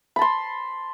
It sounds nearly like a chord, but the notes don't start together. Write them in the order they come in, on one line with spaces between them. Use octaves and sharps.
B5 A5 C6